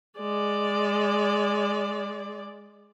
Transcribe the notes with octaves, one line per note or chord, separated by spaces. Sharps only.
G#3 D5